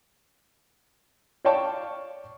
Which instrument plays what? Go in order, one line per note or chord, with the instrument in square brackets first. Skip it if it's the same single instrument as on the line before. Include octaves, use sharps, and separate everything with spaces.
[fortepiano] C#5 D5 F5 G5 A5 C#6